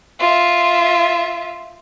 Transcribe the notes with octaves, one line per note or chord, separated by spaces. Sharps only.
F4 E5